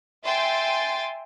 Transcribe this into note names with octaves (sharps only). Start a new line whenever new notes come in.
E5 G5 G#5 C6 A6